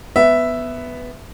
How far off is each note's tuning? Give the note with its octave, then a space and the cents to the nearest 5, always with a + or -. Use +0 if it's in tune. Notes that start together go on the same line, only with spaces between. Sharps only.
B3 +5 E5 +0